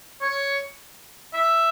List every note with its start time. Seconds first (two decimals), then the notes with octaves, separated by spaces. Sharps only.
0.22 C#5
1.33 E5